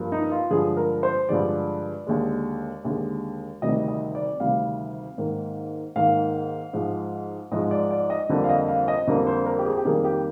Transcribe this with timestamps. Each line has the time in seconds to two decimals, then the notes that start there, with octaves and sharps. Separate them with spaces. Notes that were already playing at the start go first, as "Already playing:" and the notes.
Already playing: G2 F3 A#3
0.12 D#4
0.32 F4
0.51 G2 D3 F3 G#3 G#4
0.77 A#4
1.03 C5
1.29 G2 D3 F3 G#3 D5
2.07 D#2 D3 G#3
2.85 D#2 D3 G#3
3.62 D2 C3 D#3 G3 D#5
3.88 D#5
4.15 D5
4.40 D2 C3 D#3 G3 F5
5.18 G#2 D#3 A#3
5.96 G#2 D#3 A#3 F5
6.73 G#2 F3 G#3
7.52 G#2 F3 G#3 D#5
7.71 D5
7.91 D5
8.10 D#5
8.29 F2 D3 G3 A#3
8.44 F5
8.49 D#5
8.68 F5
8.88 D#5
9.07 F2 D3 G3 A#3
9.27 C5
9.46 A#4
9.59 G4
9.66 G#4
9.77 G4
9.85 F2 D#3 G3 A#3 G#4
10.05 G4